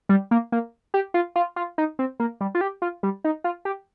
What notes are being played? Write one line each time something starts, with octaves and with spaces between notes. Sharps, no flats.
G3
A#3
A#3
G4
F4
F4
F4
D#4
C4
A#3
G3
F4
G4
F4
G3
D#4
F4
G4